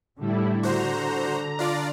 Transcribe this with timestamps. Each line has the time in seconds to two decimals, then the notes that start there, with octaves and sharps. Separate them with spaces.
0.19 A2 D3 G3 E4
0.63 F#4 C5 A#5
1.59 D4 F4 D5